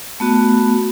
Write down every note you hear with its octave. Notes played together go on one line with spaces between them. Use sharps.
A3 B3 F#4